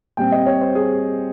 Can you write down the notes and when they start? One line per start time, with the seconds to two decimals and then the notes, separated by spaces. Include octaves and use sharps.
0.17 A#2 G3 C4 G5
0.32 D#5
0.46 C#5
0.61 C5
0.75 G#4